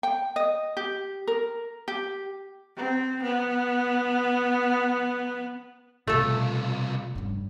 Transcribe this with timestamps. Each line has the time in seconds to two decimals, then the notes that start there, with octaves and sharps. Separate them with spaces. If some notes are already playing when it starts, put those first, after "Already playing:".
0.03 G5
0.36 D#5
0.77 G4
1.27 A#4
1.88 G4
2.77 C4
3.22 B3
6.07 C2 B2 A3 A#3 F4 A4
7.15 G2 C#4